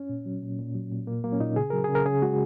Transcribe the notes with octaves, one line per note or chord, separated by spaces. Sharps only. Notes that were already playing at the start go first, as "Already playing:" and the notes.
Already playing: C#4
A#2
F#3
A#2
A#2
F#3
A#2
A#2 A#3
F#3 A#3
C#4
A#2 D#4
C#3 G#4
F#3 A#4
G#4
C#3
A#4
C#3 G#4
G#3 F#4